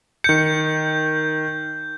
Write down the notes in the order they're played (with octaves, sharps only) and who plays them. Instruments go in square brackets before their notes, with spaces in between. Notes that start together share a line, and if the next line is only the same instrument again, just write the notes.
[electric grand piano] D#3 C#7 [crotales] G6